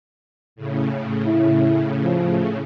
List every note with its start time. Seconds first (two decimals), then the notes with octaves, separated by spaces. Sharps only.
0.56 A2 C#3
1.26 E4
2.02 F3